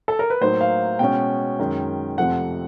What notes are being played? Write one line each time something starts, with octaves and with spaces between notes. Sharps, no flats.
A4
A#4
B4
A2 F#3 A#3 D#4 C5
F5
B2 G#3 C#4 G5
F#2 D#3 G#3 C#4
F2 C3 F3 A3 C4 F#5